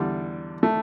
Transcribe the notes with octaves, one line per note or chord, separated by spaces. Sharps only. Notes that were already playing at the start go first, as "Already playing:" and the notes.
Already playing: E2 D3 G3
A3